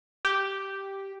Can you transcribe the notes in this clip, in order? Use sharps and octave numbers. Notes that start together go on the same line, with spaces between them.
G4